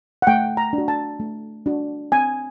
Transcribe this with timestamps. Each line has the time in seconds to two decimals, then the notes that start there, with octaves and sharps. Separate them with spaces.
0.22 F#5
0.27 A3 G5
0.57 A#5
0.73 D4
0.78 F#4
0.88 A5
1.20 A3
1.66 D4 F#4
2.12 C4 G#5